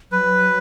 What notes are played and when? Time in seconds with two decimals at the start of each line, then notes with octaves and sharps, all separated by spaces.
0.12 F#3 B4